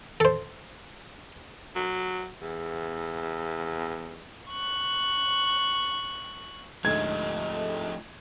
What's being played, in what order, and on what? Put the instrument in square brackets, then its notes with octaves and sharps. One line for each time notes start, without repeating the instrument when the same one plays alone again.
[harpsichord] A4 C5
[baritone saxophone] F#3
E2
[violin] C#6 F#6
[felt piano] D2 G#2 [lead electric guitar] F3 A3 [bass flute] D#5 [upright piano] G#6